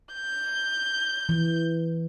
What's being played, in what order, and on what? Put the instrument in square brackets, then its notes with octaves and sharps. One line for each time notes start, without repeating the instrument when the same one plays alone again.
[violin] G6
[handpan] E3